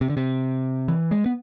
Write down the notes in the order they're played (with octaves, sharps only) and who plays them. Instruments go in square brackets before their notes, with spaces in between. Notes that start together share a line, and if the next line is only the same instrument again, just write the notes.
[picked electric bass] C3
D3
C3
E3
G#3
B3